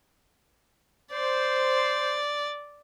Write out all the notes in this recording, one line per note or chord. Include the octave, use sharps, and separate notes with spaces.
C5 D5